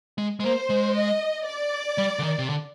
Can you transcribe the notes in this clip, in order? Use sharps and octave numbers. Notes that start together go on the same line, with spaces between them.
G#3
G#3
A#3 C5
G#3
D#5
D5
G3
D3
D#3
C3
D3